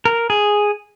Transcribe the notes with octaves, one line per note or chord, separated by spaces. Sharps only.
A#4
G#4